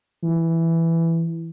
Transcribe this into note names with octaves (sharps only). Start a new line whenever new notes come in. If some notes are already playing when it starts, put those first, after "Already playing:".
E3